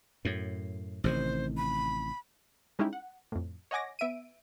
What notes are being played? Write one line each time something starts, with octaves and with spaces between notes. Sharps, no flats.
F#2 A2
A1 C3 D#3 C5
B5
G3 G#3 C#4 D#4 E4 G4
F#5
F2 A2
C#5 D#5 F#5 G#5 D6 A#6
B3 E5 D7 D#7